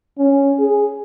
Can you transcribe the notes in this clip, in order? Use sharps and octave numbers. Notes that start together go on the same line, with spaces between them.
C#4
G#4